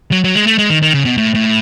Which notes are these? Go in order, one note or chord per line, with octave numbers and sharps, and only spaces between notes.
F#3
F#3
G#3
A3
G#3
D#3
D#3
C#3
B2
A2
A2